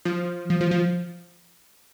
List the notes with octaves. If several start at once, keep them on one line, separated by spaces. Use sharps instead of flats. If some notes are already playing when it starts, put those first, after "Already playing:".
F3
F3
F3
F3